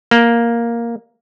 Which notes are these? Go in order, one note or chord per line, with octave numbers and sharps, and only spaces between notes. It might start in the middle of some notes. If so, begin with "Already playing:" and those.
A#3